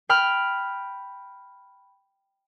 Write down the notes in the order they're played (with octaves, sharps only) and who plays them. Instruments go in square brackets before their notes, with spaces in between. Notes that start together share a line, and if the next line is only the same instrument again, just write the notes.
[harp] G5 B5 F6